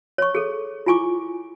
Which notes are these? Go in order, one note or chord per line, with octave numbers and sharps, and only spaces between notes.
C#5 C#6
G#4 A4
E4 F4 G#5 C#6 D6